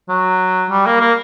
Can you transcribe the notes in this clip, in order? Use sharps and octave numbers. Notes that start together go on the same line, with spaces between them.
F#3
G3
A#3
A#3